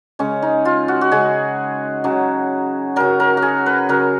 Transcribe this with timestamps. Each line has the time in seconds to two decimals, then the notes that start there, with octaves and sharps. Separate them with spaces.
0.19 C#3 G#3 C#4
0.42 D#4
0.65 F4
0.88 F#4
1.01 F#4
1.12 C#3 G#3 G#4
2.04 C#3 F#3
2.96 C#3 F#3 A#4
3.20 A#4
3.37 F#4
3.42 G#4
3.66 B4
3.89 C#3 F#3 A#4